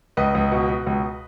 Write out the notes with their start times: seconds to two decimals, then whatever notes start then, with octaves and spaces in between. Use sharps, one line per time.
0.17 C#2 B4 D#5
0.35 C#2
0.52 B2
0.69 B2
0.86 C#2